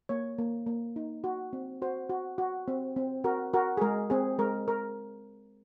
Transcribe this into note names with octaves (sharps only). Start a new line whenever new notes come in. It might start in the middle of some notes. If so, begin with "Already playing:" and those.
A#3 C#5
A#3
A#3
D#4
F#4
C4
F#4 C5
F#4
F#4
C4
C4
F#4 A#4
F#4 A#4
G#4
G#3 A#4
C4 G#4
G#3 A#4
A#4